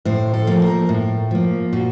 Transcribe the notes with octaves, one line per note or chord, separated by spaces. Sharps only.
A2 C5
A4
F3 A#3
A#4
A2
F3 A#3
A#2 F#4